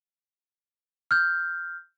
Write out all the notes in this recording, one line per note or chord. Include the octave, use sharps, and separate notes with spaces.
F6 G6